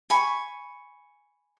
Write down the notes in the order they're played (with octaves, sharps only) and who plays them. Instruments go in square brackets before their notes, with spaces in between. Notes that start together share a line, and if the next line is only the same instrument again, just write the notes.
[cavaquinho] G#5 B5 C#6